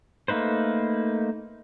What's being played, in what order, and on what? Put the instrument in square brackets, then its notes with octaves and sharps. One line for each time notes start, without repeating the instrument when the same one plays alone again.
[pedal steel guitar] A3 A#3 D#4 B4 C5